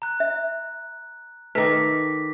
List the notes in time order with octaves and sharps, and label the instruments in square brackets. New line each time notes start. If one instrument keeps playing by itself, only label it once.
[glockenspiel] A#5 F#6
[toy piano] E5
[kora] D#3 A3 [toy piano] B4 [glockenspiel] D6 A#6 B6